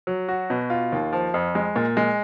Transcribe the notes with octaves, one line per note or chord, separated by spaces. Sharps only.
F#3
F#4
B2
F4
D#2
F3
F2
G#3
A#2
G#3